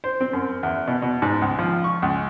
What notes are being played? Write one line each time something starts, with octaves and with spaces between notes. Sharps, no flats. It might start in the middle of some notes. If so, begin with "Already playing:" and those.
C5
C4
F#2
E2
B2
B2
G#2
C#2
F3
C#6
C#2